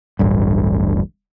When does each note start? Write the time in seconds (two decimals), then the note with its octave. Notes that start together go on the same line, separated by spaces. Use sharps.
0.19 D1 A1 G2